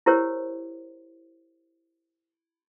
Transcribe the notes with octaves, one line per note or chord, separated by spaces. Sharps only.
E4 G4 A#4 C5 C#5